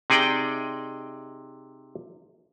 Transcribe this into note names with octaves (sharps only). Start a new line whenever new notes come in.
C3 D#4 G#4 D5 D#5 G5